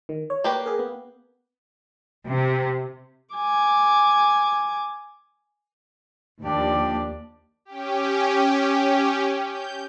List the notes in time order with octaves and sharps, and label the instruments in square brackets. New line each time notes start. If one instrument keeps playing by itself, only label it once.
[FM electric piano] D#3
C#5
[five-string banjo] A#3 G4 B4
[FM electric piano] G#4 A#4
B3
[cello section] C3
[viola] G#5 D6
[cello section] D#2 [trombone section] F3 D4 [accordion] G4 [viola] D5
[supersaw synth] C#4 G4
G6